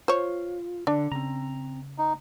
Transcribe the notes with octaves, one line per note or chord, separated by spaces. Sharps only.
F4 C5 C#5
D3 D4 D5
C#3 C4 A#5
D#4